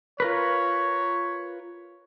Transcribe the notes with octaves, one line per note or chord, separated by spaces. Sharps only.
F4 A#4 B4 C#5